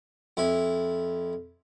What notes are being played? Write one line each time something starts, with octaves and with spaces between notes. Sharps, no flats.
F2 E4